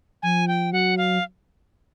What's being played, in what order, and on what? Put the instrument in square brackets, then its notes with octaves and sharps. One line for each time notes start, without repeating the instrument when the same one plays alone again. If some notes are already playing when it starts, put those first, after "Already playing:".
[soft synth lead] F3 [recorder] G#5
[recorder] G5
[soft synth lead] F#3 [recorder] F#5
[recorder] F5